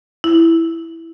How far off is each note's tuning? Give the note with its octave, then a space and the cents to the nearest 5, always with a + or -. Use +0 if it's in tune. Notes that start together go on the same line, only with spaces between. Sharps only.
E4 +0